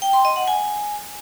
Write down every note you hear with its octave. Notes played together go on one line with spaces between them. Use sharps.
G5
C6
D#5
F#5
G#5